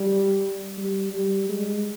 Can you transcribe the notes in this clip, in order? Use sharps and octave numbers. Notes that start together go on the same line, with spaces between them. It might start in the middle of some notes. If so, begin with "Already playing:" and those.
Already playing: G3
G3
G3
G#3